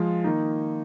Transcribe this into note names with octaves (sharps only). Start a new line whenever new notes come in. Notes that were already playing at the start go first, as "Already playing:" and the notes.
Already playing: F3 G#3 F4
D#3 A#3 D#4